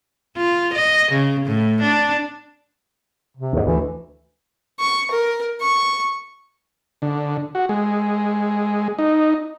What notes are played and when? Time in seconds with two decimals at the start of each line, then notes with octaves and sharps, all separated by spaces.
0.37 F4
0.75 D#5
1.12 C#3
1.46 A2
1.82 D4
3.37 C3
3.53 D#2 G#2
3.66 D2 E3
4.80 C#6
5.11 A#4
5.61 C#6
7.02 D3
7.55 F#4
7.69 G#3
8.99 D#4